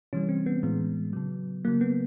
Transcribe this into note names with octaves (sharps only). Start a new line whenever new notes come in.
C3 E3 G3 C#4
C4
B3
A2 E3 G#3
C#3 F#3
C#3 F#3 A#3
B3